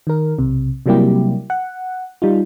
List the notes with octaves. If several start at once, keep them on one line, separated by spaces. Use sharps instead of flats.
D#3 A#4
B1 C3
C3 F#3 G3 A#3 E4 G4
F#5
G3 D#4 F4